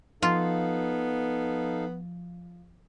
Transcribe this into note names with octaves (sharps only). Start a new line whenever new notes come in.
F3 B3 D#4 F4 A4 F5